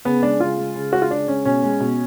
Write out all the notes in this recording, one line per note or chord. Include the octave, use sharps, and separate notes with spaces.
C#3 B3
G#3 D4
C#3 F4
G#3
C#3
G#3 F#4
F4
C#3 D4
G#3 C#4
B2 C#4
G#3
B2